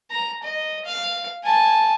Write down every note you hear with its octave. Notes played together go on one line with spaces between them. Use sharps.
A#5
D#5
F5
G#5 A5